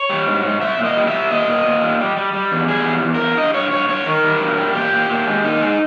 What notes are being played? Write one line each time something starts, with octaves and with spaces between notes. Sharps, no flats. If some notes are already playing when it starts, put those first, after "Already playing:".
Already playing: C#5
G3
G#2
G#2
G3 E5
A#2
D#5
G3
E5
G3
A#2 D#5
A#2
A#2
G3
G3
G3
G3
E2
G3 G#4
E2
E2
A#4
E2
G2 D#5
G2 C#5
G2 C#5
G2 C#5
D#3 A#4
G3
G2
G3
A#2 G4
A#2
A#2
G#3
A#2 D#4
G#3